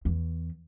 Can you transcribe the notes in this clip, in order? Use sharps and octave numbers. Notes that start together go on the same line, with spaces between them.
E2